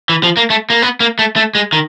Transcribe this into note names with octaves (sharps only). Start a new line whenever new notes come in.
E3
F3
A#3
A3
A#3
B3
A#3
A3
A3
G#3
D#3